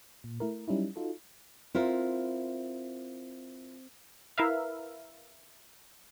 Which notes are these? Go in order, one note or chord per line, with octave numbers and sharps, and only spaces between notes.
A#2
A3 E4 A#4
F#3 G3 C#4 D#4 E4
D#4 F4 F#4 A4
C4 E4 F4 A#4 C5
E4 A#4 B4 E5 F5